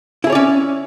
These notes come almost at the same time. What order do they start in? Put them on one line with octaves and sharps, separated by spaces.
E4 G#4 C#5 D5 C#4